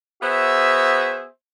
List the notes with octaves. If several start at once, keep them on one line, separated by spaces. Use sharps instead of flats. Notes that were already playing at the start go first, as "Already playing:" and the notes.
B3 F#4 G#4 C5 E5